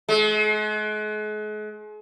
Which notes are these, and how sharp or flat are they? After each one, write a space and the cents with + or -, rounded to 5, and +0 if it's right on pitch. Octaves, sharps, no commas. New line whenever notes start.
G#3 +40